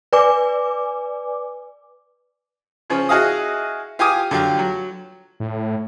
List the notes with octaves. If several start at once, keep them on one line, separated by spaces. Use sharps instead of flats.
B4 D5 G#5 D6
C#3 F3 C#4
E4 F#4 G#4 D#5 F5 D#6
F4 G4 G#5 D6 D#6
D3 F#3 F4 G4
F#3
A2